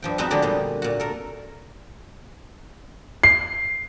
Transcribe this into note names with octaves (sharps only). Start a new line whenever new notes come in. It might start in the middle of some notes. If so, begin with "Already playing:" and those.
G2 F3 G5
G#3 B3 C4 D#4 F#4 B4
D3 F3 G#3 D4 G4
A#2 D3 G3
A#2 F#4
A4 A#4
C7